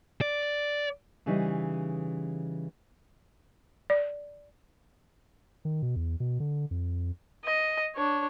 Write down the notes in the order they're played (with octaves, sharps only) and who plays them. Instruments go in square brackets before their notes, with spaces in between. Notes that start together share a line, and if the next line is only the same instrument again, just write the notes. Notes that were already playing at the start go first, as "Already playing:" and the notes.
[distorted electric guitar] D5
[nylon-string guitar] C#3 E3 G3 C#4 D#4
[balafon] D5
[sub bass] D#3
B2
E2
B2
D3
F2
[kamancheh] D#5
D4 C#5